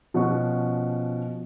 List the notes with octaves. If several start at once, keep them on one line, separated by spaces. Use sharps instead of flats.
B2 F3 C#4 F#5 C#6